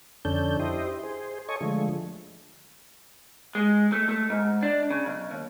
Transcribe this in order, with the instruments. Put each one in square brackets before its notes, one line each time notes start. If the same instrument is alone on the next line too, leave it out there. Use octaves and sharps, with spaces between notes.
[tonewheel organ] F2 D3 C#4 D4 A4 G6
E4 G4 C5 D#5
G#4 C5
A4 C#5 D#5 G#5 C#6
D3 F3 G#3 A3
[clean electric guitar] G#3
A3
A3
G#2
D4
C#3
B1
D#2